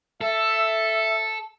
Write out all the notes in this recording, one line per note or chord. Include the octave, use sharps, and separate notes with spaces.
A4 E5